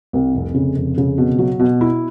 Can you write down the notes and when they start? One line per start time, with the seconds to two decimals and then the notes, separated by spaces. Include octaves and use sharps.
0.13 C2
0.35 F1
0.54 C#3
0.75 F1
0.98 C#3
1.18 B2
1.38 F#3
1.59 B2
1.81 E4